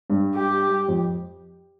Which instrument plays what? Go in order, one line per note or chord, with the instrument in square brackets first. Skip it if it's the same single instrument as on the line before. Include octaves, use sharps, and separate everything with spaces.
[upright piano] G2
[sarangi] G4
[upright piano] F2